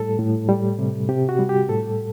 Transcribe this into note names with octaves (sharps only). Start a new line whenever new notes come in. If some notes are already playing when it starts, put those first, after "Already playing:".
Already playing: A2 G3 A4
A2
G3
C3
C3 G4
F#4
G3
G4
A2 A4